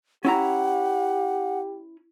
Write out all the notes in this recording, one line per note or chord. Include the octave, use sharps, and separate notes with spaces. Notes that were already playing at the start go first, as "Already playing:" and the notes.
C#4 E4 G4 F#5 A#5